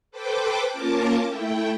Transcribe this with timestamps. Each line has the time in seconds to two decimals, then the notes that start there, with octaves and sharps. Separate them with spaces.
0.11 A4 B4 C5 G5 D6
0.71 A#3 C#4 F4 A#4 A5 D6
1.25 A3 E4 G5